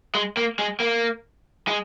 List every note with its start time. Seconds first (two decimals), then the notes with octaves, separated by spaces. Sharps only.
0.15 G#3
0.37 A#3
0.59 G#3
0.80 A#3
1.68 G#3